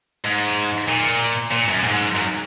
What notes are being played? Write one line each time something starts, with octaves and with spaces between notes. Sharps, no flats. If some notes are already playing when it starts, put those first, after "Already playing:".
G#2
A#2
A#2
F#2
G#2
F#2